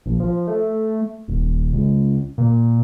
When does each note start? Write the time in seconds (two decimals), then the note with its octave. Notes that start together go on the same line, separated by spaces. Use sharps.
0.06 A#1
0.20 F3
0.48 A3
1.28 D#1
1.73 C#2
2.38 A#2